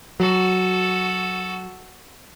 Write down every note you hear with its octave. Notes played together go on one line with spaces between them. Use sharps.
F#3 F#4 A4